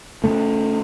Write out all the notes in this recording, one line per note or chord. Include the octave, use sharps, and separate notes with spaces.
C#3 A3